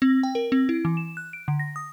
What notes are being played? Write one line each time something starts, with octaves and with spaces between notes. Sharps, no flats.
C4
G5
A#4
C4
E4
E3
E7
F#6
D7
D3
A#6
D#6